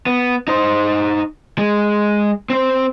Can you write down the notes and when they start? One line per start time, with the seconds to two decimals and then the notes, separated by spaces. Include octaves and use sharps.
0.06 B3
0.48 D#4 C5
1.58 G#3
2.50 C4 C5